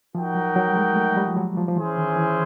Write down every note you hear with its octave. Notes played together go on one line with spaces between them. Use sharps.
F3 D#4 F#4 A#4 D#5 G5
F#3
F#3
G3
G#3
A3
G3
F3
F#3
F3
F3
E3 C#4 E4 G#4 C5
D#3
E3